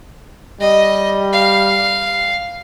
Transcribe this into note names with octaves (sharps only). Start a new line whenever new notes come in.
G3 D#5
F5